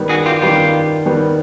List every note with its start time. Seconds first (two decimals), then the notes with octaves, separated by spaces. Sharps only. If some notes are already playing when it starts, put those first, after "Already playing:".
Already playing: D#3 G3 B3
0.09 F#4 G#4
0.26 F4 G4
0.41 D#3 G3 B3 F4 G4
1.06 D#3 G3 B3